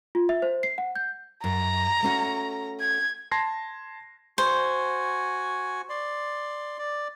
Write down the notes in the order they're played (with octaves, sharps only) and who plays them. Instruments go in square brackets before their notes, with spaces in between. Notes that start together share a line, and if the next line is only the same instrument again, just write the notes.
[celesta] F4
E5
C5
C7
F#5
G6
[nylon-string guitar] F#2 [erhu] A#5
[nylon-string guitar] A3 C#4 F#4
[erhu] G#6
[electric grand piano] A5 C6 G#6 A#6 C7
[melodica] F#4 G#5 [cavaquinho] C5
[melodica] D5 C6
D5